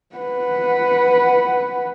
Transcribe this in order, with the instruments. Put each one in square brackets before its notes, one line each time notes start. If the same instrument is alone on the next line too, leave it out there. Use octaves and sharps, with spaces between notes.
[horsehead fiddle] B4 F#5